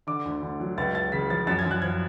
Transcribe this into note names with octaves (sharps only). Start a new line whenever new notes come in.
D3 D6
D2
D2
F#3
C#2 A6
C#2 A6
C#3 B6
F3 A6
F#2 A6
G#6
F#2
F#6
F3 G#6